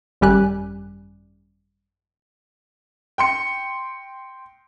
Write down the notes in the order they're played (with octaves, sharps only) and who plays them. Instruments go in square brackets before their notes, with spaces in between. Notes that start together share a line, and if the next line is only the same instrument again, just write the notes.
[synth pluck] G#1 F#2 G3 G4 G#5 F#6
[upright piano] G5 C6 C#7